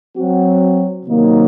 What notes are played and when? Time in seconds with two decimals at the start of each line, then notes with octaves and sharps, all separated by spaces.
0.16 F#3 C4 F#4
1.05 C3 D#3 F#3 A#3 D#4